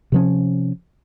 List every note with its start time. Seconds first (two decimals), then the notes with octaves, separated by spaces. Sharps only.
0.12 C3 F3 C#4